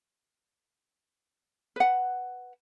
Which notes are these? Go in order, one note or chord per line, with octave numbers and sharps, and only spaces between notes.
B4 F#5